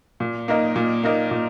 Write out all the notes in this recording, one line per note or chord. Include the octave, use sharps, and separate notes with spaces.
A#2
A#3 D#4 A#4 D#5
A#2
A#3 D#4 A#4 D#5
A#2